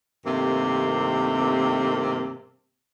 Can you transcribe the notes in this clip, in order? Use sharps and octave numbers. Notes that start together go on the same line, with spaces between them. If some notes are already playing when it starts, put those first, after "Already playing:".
G2 C3 D#3 A3 A#3 C4